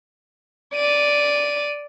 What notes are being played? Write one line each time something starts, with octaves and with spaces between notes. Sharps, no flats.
D5 D#7